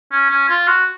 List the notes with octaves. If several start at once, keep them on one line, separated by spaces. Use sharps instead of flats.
C#4
C#4
F4
F#4